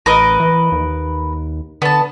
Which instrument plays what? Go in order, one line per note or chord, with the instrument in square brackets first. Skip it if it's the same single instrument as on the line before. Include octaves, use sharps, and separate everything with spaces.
[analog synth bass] A1 [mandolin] A#4 B4 D#5
[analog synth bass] E3
D#2
[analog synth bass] D3 [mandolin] B3 A5